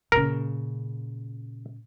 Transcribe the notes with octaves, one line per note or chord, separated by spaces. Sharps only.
A#2 C#3 A#4